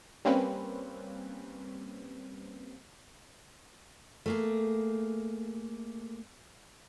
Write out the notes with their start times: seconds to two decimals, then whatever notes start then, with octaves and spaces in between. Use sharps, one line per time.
0.25 G3 A#3 C4 C#4 B4
4.26 A3 A#3 G#4